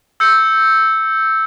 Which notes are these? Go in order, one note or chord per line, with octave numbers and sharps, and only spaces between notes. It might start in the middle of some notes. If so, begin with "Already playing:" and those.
E6 G6 C#7